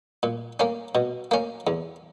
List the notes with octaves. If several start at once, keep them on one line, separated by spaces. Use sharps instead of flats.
A#2
A#3 C#4
B2
A#3 C#4
E2